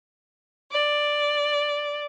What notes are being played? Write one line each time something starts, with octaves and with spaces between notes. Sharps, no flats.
D5